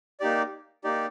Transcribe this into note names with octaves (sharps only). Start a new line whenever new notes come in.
A#3 D#4 G4 D5
A#3 D#4 G4 D5